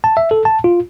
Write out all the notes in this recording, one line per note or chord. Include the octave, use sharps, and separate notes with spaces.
A5
E5
A4
A5
F4